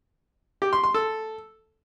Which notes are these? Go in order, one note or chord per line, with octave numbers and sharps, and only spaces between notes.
G4
C6
C6
A4